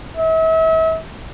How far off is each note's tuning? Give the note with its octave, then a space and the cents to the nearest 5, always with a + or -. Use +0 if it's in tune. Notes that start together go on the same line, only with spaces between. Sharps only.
E5 -40